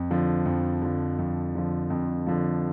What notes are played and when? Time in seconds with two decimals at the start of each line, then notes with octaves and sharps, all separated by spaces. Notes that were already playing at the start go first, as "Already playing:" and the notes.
Already playing: F2
0.11 D3 F3
0.46 F2
0.82 D3 F3
1.19 F2
1.55 D3 F3
1.90 F2
2.27 D3 F3